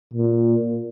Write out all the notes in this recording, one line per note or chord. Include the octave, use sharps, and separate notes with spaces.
A#2